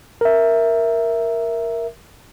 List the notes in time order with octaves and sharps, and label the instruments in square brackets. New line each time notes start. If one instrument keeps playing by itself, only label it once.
[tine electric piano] A#4 E5